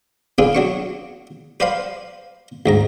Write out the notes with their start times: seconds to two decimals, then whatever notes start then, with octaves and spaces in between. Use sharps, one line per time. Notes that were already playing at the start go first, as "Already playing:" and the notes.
0.38 D4 F4 G#4 A4 B4
0.55 F#3 D4 C#6
1.60 B4 C5 D5 F5 B5 C6
2.66 D2 G#2 A#5